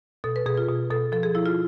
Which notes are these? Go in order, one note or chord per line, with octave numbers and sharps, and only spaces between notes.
B2 A4
B4
B2 G#4
F4
B2
B2 A4
F3 A4
G#4
F3 E4
F4